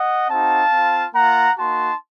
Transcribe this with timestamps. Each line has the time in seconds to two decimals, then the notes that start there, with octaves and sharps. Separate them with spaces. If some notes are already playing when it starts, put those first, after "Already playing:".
Already playing: D#5 F#5
0.29 C4 D#4 F#4 F5 A5
0.72 C4 F4
1.14 A#3 F4 F#5 A#5
1.57 A#3 D#4 F#4 A5 C6